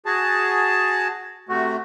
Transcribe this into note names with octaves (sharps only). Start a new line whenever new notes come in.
F#4 G#4 A5
C3 A3 F#4